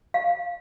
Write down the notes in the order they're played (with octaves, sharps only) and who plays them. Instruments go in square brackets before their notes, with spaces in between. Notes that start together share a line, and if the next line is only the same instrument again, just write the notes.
[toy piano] F5